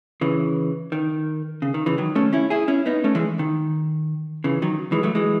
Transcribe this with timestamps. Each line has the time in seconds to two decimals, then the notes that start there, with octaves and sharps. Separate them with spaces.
0.21 C#3 E3
0.92 D#3
1.62 C#3
1.74 D#3
1.86 C#3 E3
1.98 D#3 F#3
2.15 A3 C#4
2.33 C#4 E4
2.50 E4 G#4
2.68 C#4 E4
2.86 B3 D#4
3.04 A3 C#4
3.15 E3 G#3
3.39 D#3
4.44 C#3 E3
4.62 D#3 F#3
4.92 E3 G#3
5.03 F#3 A3
5.15 E3 G#3